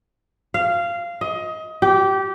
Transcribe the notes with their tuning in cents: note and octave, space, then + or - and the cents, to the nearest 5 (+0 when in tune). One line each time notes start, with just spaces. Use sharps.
F5 -15
D#5 +25
G4 -20